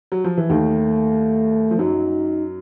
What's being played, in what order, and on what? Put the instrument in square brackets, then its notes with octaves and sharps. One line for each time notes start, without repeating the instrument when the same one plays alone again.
[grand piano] F#3
F3
E3
[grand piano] D#2 D#3 [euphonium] A3
[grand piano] F3
[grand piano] F#2 F#3 [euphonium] D#4